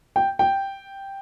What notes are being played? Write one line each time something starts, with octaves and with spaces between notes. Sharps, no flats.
G5
G5